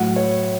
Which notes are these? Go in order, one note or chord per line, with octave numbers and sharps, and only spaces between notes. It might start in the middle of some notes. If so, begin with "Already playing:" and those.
Already playing: A2 F#3 F#5
C#5